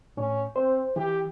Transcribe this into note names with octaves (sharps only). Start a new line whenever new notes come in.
A2 C#4
C4 C5
E3 G4